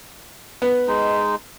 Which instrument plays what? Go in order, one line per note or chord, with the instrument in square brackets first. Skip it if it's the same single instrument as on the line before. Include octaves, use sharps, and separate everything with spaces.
[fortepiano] B3
[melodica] G#3 D#4